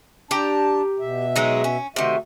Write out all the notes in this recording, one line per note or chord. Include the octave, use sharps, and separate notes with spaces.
D4 G4 A5 A#5
B2 E5
F#3 G#3 D#4
C#4
C3 D#3 A3 F#4 E5